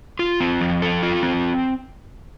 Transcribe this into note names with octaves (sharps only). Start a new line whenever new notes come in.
F4
C4
F3
A4
F4
C4